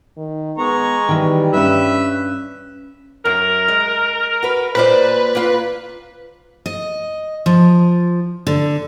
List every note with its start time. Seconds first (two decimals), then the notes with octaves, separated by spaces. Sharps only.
0.17 D#3
0.58 G#3 B3 A#5 C#6
1.09 D#3 E3 G3
1.53 G2 C#4 B4 E5
3.25 F#2 A#4
3.68 G#3
4.42 F#4 B4
4.75 A#2 B4 C5 D5
5.35 A#3 F4
6.66 D#5
7.46 F3
8.47 D3